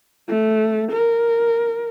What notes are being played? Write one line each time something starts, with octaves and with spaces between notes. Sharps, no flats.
A3
A#4